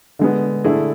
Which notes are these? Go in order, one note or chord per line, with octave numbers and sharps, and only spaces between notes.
D3 G#3 B3
D3 A3 E4 G#4